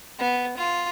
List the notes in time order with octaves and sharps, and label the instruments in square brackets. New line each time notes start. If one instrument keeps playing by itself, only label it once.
[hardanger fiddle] B3
F4